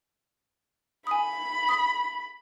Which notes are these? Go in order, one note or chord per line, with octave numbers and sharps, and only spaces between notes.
G#5 B5 D#6
D#6